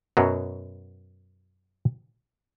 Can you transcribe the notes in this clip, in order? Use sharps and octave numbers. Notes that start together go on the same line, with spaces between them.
F#2 B2 F#3